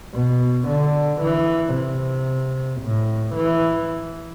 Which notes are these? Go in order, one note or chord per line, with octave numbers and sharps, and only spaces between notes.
B2
D3
E3
C3
A2
E3